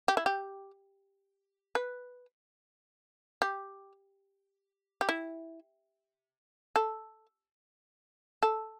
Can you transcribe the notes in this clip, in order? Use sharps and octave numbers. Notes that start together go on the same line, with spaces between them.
G4
E4
G4
B4
G4
G4
E4
A4
A4